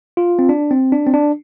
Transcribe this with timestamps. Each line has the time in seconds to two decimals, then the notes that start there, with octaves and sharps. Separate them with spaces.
0.17 F4
0.39 C4
0.49 D4
0.71 C4
0.92 D4
1.07 C4
1.14 D4